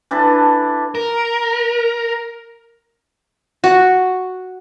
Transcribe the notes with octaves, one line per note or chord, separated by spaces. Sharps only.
E3 D4 A4 B4
A#4
F#4